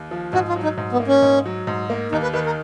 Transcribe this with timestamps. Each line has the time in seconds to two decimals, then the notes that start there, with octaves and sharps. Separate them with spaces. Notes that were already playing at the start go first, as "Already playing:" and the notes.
Already playing: D#2
0.11 F3
0.33 G#2 F#4
0.48 F4
0.56 F#3
0.63 D#4
0.77 G#2
0.93 B3
1.00 A#3
1.08 C#4
1.22 G#2
1.46 F#3
1.67 G#2
1.90 A#3
2.12 D#2 D#4
2.23 B4
2.34 D#3 B4
2.46 A#4